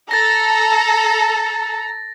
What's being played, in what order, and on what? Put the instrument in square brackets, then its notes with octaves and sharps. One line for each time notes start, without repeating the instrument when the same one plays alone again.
[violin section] A4 [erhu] A#5 [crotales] A6 A#6